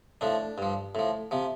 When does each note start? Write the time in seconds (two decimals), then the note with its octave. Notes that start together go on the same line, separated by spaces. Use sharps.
0.21 A2 F3 D4
0.58 G2 F3
0.95 A2 F3
1.31 C3 F3